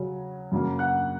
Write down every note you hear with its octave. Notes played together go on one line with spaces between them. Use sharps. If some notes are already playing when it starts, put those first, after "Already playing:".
Already playing: C#3 F#3 C#4
F#2 C#3 F#3 A#3
F#5 F#6